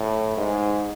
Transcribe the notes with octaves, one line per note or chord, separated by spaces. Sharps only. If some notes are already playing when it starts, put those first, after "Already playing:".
Already playing: A2
G#2